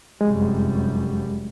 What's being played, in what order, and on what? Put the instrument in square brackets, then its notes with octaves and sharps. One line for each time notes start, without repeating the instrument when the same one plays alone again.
[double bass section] F1 F#2 G3 [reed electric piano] G#3